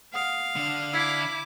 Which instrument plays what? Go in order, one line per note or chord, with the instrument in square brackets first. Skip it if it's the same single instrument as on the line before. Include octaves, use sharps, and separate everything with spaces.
[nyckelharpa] F5 [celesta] F#5 D#6
[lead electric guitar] D3 D4
[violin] E4 D6 [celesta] E6 G#6 B6